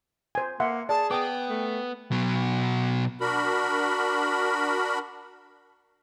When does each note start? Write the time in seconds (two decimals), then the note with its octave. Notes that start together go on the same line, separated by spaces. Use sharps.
0.35 C5 G#5
0.60 A#3 E5 F#5 C6
0.89 G#4 D5 A5
1.11 B3 G5 D6 D#6
1.50 A3
2.12 B2 F#3
3.21 D4 F#4 A#4 B5